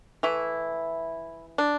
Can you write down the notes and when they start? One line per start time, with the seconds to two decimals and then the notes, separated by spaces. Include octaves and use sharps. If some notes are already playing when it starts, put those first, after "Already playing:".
0.23 E3 A3 E4
1.58 D4